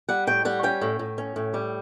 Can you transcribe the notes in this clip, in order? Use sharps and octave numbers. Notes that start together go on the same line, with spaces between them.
G3 F#5
A2 G5
G3 F#5
C#4 G5
A2
A2
C#4
A2
G3